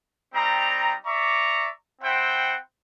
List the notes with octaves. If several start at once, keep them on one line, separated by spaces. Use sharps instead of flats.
G3 C4 D#4 A#5
D5 E5 A#5 C#6 D6
C4 E4 C5 F#5 G5